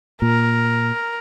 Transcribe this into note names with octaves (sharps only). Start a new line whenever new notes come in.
A#2 A#4